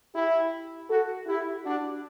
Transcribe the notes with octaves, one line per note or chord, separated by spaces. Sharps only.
E4 G4
F#4 A4
E4 G4
D4 F#4